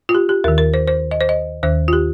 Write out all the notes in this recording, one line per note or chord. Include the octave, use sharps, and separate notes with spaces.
F4
G4
G4
D#2 D#3 A#4
A#4
C5
C5
D#5
C5
D#5
D#2 D#3 C5
F4
G4